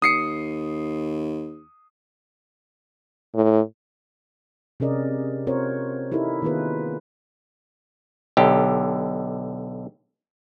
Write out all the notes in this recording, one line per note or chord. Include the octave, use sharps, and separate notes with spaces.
D#2 D#6 C7 C#7
A2
C3 C#4 G#4 A#4 D5 D#5
C4 F4 A#4 C5 C#5
D#4 E4 G4 A4 A#4
D#3 A#3 B3 F4 G#4 B4
B1 D3 G4